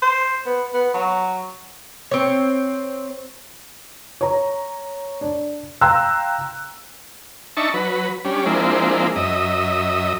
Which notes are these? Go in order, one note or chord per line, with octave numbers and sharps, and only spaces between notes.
C5
B3
B3
F#3
C4 C#5
C#5 A#5
D4
F5 G5 A#5 C6 E6 F#6
D4 D#4 E5 A5 C#6
F#3 B4
G3 C#4 D4
F3 G#3 A#3 C4 D4 E4
F#2 D#5 E5